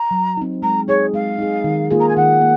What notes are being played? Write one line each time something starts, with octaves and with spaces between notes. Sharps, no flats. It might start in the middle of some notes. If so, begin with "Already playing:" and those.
Already playing: A#5
F#3
C4 D#4
G#3 A#5
D#4 G#4 C#5
G#3 F5
D#4 G#4
D#3
A#3 F4 G#4
A#5
G#5
D#3 F#5
A#3